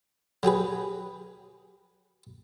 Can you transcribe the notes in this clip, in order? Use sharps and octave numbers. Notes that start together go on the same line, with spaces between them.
F#3 G4 G#4 B4